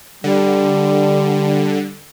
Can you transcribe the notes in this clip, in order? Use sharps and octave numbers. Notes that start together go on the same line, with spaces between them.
D3 G3